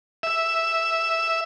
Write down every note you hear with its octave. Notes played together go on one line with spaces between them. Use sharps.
E5